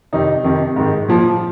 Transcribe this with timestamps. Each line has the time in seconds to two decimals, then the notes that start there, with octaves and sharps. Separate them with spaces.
0.13 F2 C3 D#3 D#4
0.44 F2 C3 D#3
0.76 G#2 D#3
1.08 A#2 F3